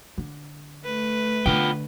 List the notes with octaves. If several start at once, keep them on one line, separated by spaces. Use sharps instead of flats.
D3
A3 B4
D3 B3 F4 G5